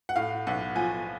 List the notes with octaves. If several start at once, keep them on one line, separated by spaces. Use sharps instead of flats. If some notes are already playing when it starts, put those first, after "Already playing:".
F#5
A2 F5
B1 F#5
F3 G#5